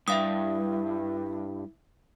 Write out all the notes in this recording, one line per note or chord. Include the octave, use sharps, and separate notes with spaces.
G2 E4 E5 F5 D#6